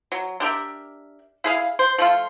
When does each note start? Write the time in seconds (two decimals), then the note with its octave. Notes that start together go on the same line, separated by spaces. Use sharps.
0.12 F#3
0.40 D4 G4 A#4 E5
1.44 E4 G#4 F5
1.79 C5
1.98 F3 A3 F4